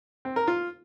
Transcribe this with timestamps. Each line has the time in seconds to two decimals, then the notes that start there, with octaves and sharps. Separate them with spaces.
0.25 C4
0.36 A#4
0.47 F4